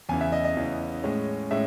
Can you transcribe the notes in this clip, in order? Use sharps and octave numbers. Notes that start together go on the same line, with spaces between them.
E2 C#3 E3 G#5
E5
D#5
D#5
E2 C#3 E3
A2 G#3 C#4
A2 G#3 C#4 E5